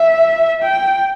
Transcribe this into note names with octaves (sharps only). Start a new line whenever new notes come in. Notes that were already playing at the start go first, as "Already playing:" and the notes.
Already playing: E5
G5